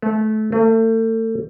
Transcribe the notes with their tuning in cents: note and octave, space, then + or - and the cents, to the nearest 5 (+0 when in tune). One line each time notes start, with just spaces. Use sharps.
A3 -25
A3 +35